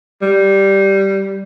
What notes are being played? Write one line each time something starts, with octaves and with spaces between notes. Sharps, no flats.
G3